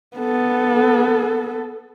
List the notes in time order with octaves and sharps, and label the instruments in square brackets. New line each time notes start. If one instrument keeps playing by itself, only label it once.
[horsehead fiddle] B3 A4